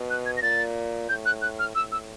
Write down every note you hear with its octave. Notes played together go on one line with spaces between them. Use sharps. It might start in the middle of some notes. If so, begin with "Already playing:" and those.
Already playing: B2
F#6
G#6
A#6
A#2 A6
A2 G6
F#6
F#6
F6
A2 E6
E6